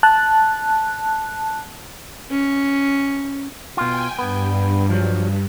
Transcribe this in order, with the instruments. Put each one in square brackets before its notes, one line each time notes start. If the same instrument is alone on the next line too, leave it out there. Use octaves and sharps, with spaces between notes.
[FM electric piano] A5 F#6
[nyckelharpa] C#4
[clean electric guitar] B2 F4 [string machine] G5 G#5
[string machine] G2 [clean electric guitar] B3
[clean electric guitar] F3 F#3